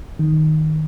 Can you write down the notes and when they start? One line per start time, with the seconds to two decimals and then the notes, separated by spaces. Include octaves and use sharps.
0.19 D#3